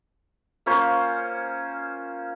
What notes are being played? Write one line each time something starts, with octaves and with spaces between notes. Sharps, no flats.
A#3 C#4 F4 C5